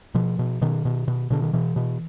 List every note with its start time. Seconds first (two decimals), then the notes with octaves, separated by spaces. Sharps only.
0.15 B2 F3
0.39 B2
0.62 B2 D#3
0.85 B2
1.08 B2
1.30 B2 D3
1.42 D#3
1.53 B2 E3
1.76 B2